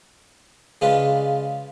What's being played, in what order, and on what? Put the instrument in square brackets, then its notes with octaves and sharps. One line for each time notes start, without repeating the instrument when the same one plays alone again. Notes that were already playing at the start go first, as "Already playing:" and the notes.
[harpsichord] C#3 G#3 D4 F4 B4